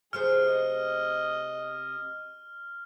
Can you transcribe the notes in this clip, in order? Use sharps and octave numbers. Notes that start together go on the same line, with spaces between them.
C3 A3 C4 G#4 F6
D#5